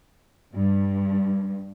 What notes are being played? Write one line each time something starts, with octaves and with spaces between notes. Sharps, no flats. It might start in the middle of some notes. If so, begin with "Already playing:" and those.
G2